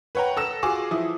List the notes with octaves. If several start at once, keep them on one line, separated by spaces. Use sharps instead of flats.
B4 C#5 F#5 G5 A#5
A4 E6 A#6 E7
F4 F#4 G#4 D6
E3 F3 E4 D#6